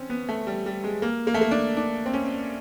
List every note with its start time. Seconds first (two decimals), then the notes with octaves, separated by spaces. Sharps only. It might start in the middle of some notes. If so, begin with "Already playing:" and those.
Already playing: C4 C#4
0.10 B3
0.29 A3
0.47 G3
0.66 G3
0.84 G#3
1.02 A#3
1.27 A#3
1.34 A3
1.41 A#3
1.51 D4
1.77 D4
2.06 C4
2.13 C#4